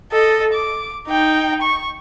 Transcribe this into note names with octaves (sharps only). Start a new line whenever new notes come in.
A4 D#5
D6
D#4 G5
C#6